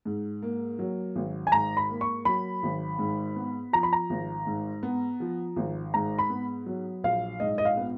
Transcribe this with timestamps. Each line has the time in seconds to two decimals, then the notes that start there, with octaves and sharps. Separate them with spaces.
0.05 G#2
0.42 A#3
0.79 F#3
1.16 G#1
1.47 G#5
1.52 G#2 A#5
1.77 B5
1.90 A#3
2.01 C#6
2.25 F#3 B5
2.63 G#1
2.99 G#2
3.36 B3
3.73 F3 A#5
3.83 B5
3.93 A#5
4.10 G#1
4.47 G#2
4.83 B3
5.20 F3
5.56 G#1
5.94 G#2 A#5
6.19 B5
6.30 B3
6.66 F#3
7.04 A#1 F5
7.40 G#2 D#5
7.58 D#5
7.65 F5
7.77 B3